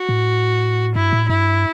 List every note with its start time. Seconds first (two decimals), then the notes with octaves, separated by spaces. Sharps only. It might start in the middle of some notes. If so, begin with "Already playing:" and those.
Already playing: F#4
0.09 A2
0.95 G2 E4
1.13 A2
1.29 G2 E4